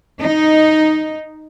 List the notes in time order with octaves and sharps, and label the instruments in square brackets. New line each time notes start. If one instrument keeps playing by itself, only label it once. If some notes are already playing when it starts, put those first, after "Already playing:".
[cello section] D#4